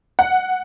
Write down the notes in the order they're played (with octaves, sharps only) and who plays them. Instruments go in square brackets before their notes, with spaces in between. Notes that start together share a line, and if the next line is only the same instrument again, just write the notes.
[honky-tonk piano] F#5